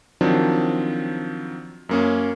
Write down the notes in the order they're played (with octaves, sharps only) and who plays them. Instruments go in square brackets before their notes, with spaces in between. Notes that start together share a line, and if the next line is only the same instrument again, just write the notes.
[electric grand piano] D#3 F3 F#3 C4 D4
F#2 A#3 C#4